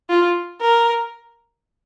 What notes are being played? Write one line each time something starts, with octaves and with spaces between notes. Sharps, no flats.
F4
A#4